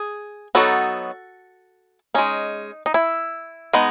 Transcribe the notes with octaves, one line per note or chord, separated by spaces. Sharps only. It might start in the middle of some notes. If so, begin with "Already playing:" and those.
Already playing: G#4
F#3 B3 D#4 F#4 A4
G#3 C#4 D#4
D#4
E4
G#3 B3 D#4